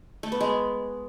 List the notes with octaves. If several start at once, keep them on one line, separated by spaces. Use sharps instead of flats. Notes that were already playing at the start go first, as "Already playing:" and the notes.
A3
B3
G#3